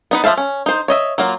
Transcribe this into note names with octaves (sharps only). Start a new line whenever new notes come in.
B3 D#4 B4
F3 E4 E5 F5 A5
C#4
D#4 C5
C#5 D#5 E5
F#3 A#3 F4